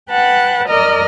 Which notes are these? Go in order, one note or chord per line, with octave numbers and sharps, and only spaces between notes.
B4 F#5 G5 A5 F#6
A#4 D5 D#5 A#5 F6